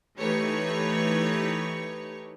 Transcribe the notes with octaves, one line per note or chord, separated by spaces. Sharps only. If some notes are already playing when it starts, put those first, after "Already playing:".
E3 A3 D#4 G4 B4 C#5